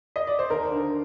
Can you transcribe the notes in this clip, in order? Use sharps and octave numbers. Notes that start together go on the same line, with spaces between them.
D#5
D5
C5
D#2 A#4
D3